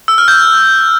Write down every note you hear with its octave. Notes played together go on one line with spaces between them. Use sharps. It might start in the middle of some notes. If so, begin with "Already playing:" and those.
E6
F6
G6